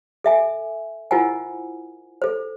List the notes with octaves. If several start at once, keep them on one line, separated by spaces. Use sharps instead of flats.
A4 E5 G#5
E4 F4 A#4 C5 F#5 G#5
A4 C5